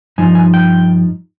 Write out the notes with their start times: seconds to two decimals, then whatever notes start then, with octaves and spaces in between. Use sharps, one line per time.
0.18 G2 F3 D#4 G#5
0.35 G#5
0.54 G5